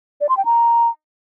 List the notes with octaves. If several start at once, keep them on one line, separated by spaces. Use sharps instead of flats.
D5
C6
G5
A#5